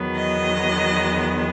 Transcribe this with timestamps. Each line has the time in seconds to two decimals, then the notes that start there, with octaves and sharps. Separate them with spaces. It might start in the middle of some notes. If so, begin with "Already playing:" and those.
Already playing: E2 D#3 F#3 B3
0.16 D#5